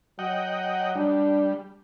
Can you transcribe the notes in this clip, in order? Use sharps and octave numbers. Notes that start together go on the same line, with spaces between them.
F#3 D#5 F#5 G5
G3 D4